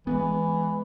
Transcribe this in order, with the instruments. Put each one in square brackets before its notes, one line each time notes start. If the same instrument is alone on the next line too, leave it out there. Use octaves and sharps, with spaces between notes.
[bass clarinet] E3 [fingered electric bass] G#3 A#3 B3